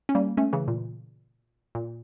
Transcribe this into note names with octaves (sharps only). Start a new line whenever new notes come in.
C#4
G3 A#3
A3 C#4
C#3 E3
A#2
A#2